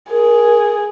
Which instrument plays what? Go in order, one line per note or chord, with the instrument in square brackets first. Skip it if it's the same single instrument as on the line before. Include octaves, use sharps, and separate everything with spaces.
[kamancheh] G#4 [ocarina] A#4